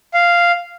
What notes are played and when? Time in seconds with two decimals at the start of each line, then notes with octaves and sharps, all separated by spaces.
0.14 F5